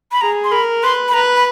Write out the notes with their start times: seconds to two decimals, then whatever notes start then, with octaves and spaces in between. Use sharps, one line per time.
0.12 B5
0.21 G#4 A#5
0.44 C6
0.52 A#4 B5
0.83 B4 C6
1.08 B5
1.14 B4 A#5
1.37 B5